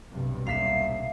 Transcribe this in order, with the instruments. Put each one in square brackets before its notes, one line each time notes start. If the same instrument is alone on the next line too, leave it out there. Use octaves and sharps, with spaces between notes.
[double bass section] B1 G2 C3
[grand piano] D#1 B6 [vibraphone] E5 F5 [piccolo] C7